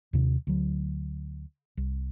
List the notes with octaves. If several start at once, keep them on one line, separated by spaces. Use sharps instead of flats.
D#2 C3
D2 F#3
C2